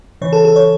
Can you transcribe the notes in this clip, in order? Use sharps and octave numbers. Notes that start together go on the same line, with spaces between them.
C#3 E3 C#5
A4
A4
C#5